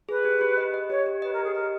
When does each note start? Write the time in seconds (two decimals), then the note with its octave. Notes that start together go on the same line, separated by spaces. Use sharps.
0.09 G#4 B4
0.25 G4
0.41 G4
0.57 D#5
0.74 D#5
0.90 G4 C#5
1.06 G4
1.22 B4 D#5
1.33 A#4
1.39 G4 G#4
1.55 A#4 D#5